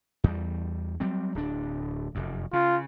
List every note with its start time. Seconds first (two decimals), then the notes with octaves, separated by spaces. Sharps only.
0.24 E2 G3
1.00 F#3 G3 C4
1.35 D1 D4
2.15 F1 F#2
2.53 C#3 F4